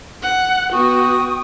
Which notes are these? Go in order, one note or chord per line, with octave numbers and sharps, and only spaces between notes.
F#5
B3 F#4 G5 C#6 D#6